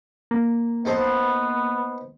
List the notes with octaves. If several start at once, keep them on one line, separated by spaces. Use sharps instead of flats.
A#3
B3 D#4 A4 C5